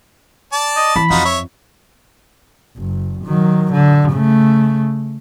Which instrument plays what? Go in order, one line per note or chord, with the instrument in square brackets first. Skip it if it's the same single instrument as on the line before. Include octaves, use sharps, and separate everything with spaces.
[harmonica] D5 A5
[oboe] D#5
[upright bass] E3 [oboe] B5
[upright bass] F2 [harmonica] D#4 F4 F#4
[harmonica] C#5 E5
[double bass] F#1
D#3 F#3
D3
C#3 A3